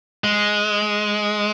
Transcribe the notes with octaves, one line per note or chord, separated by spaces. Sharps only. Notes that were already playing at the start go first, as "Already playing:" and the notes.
G#3